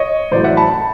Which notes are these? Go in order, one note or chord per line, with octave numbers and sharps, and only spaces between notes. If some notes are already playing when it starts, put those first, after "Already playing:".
Already playing: C#5 D#5
A1 A2 F#3 C5 D5
E5 F#5
A5 B5
A5 B5